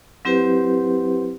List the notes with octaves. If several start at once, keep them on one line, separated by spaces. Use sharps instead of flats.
F#3 C4 E4 G4 B4 C5